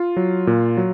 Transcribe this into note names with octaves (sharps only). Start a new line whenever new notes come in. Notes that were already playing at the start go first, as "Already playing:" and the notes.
Already playing: F4
F#3
A#2
F#3